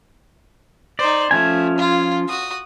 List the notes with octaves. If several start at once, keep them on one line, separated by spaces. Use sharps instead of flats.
D#4 C5 D5
F3 A3 C#4 G#5
F4
F#4 D#6